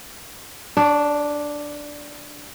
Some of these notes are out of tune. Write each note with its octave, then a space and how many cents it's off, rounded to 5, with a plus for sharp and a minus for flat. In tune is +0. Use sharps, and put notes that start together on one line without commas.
D4 +0 C#5 +40